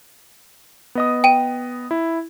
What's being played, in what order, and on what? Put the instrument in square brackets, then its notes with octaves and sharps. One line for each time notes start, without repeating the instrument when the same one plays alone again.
[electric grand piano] B3 D#5 D#6
[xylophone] G5 D#7
[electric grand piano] E4